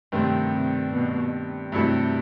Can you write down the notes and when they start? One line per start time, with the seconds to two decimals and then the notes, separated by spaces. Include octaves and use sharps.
0.12 G2 C3 D#3 A3 C4
0.52 C3
0.92 B2
1.72 G2 C3 F#3 A3 E4 A4